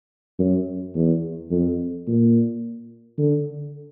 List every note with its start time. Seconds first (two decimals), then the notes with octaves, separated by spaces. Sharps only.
0.39 F#2
0.95 E2
1.50 F2
2.07 A#2
3.18 D3